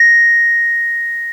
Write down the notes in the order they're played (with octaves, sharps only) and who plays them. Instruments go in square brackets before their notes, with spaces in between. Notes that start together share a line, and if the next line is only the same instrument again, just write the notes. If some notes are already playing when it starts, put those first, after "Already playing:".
Already playing: [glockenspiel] A#6